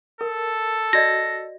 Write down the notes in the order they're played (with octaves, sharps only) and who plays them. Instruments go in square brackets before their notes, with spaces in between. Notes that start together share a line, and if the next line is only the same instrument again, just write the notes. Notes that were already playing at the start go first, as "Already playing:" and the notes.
[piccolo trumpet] A4 [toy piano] A#4
[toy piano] F#4 D5 D#5 [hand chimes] A#6